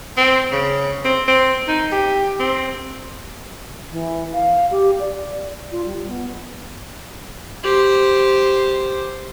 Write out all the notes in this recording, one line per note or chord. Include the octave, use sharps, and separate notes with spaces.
C4
C#3
C4
C4
D#4
G4
C4
E3
F5
G4
D5
F4
G3
B3
G4 C5